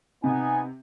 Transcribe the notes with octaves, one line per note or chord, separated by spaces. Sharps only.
C3 B3 D#4 G#5